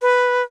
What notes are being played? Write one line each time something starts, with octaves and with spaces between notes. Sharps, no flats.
B4